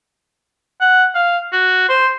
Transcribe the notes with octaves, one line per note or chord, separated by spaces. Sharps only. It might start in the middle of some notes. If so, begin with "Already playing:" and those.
F#5
F5
F#4
C5